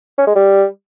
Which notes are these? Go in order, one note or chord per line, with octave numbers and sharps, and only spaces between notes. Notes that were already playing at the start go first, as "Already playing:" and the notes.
C#4
G#3
G3